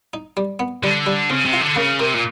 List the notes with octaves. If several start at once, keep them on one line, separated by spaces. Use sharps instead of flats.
D#4
G3
B3
D3 G3
G3
C#3 C4
C3
F4
D3
C#3 A#3
C3 A#4
A#2